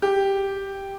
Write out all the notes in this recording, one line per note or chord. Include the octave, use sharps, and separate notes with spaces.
G4